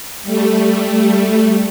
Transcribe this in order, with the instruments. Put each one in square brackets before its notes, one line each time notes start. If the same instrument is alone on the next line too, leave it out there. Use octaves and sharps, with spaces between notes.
[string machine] G3 A3